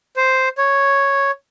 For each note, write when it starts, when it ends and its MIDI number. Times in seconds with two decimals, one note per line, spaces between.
0.16 0.49 72
0.58 1.31 73